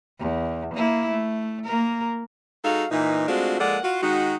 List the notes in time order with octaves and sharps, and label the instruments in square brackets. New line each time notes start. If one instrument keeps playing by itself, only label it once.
[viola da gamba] E2
A#3 E4
A3
A#3 A#4
[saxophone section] G#3 D#4 F#4 A4 F5
A#2 E3 D#4
G#3 A3 C4 D4 F4 F#4
F3 G#3 A#3 A4 D5 F#5
F4 F#4
D#3 G#3 D#4 F#4